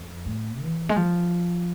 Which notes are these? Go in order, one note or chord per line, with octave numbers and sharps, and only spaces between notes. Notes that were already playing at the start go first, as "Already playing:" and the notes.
Already playing: F2
A2
E3
G#3
F3